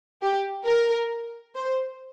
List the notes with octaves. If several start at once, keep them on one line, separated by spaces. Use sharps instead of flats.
G4
A#4
C5